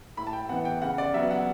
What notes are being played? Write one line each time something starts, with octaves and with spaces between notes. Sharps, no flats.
A2 B5
A5
G5
E3 B3 F#5
G5
C#3 F#5
D5
F#3 B3 E5
F#5